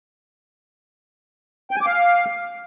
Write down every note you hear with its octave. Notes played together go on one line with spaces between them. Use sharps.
G5
G#5
D6
F5